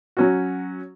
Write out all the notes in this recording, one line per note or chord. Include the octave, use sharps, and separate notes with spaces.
F#3 C#4 F#4